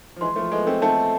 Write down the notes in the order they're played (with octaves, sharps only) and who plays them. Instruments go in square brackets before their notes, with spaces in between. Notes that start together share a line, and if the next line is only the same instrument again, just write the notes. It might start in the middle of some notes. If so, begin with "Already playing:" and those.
[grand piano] F3
[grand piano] E3 G#3 [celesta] C6
[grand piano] F3 A3
[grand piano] G#3 B3 [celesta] A4
[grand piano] A3 C4
[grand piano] A3 C4 [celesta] A5